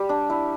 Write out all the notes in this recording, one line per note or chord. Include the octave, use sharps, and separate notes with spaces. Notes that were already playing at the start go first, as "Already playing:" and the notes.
Already playing: G3 G4
D4
E4